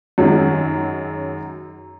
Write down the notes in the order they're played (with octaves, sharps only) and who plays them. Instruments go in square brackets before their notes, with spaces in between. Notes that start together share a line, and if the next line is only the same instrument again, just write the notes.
[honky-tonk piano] F#2 D#3 F#3 G#3